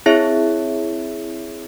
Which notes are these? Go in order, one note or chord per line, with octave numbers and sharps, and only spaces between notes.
C4 E4 G#4 C#5 E5